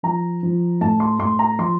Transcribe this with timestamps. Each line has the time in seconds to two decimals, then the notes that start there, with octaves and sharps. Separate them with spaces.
0.03 F3 A#5
0.43 F3
0.81 A2 A5
1.00 C6
1.19 A2 C6
1.39 A#5
1.59 F3 C6